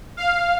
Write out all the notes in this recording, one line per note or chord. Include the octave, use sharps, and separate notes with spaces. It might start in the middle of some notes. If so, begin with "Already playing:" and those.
F5